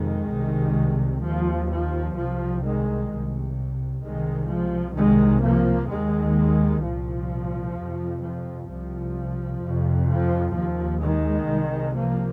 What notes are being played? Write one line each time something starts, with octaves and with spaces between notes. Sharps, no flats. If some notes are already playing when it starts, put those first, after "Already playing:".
Already playing: F2 C3 D#3 G#3
C2 C3
D#2 F3
F3
C2 C3 F3
D#3 G#3
C2 C3
C2 C3 D#3 G#3
F3
C2 C3 D#3 G#3
F3 A#3
D#2 D#3 G#3
C2 A#2 F3
F2 C3
F3
C2 C3 F3
F2 C3
F3
D#2 F3
D#3 G#3
C2 C3
F3 A#3